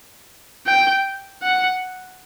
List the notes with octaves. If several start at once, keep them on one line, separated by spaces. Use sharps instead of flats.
G5
F#5